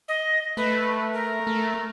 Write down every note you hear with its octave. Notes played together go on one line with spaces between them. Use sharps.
D#5
A3 B4
A#4
A3